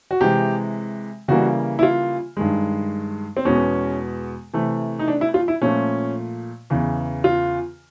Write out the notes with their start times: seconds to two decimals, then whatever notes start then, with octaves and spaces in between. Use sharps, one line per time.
0.11 F#4
0.21 C3 E3 G#3 G4
1.28 C#3 E3 G3 A#3 F#4
1.79 E4
1.83 F4
2.37 G2 D#3 G#3
3.37 C4
3.45 E2 B2 G#3 B3 C#4
4.54 C3 E3 A3
4.99 D#4
5.08 D4
5.21 E4
5.34 F4
5.48 E4
5.62 A#2 F3 A3 C#4
6.70 E2 C#3 E3
7.24 F4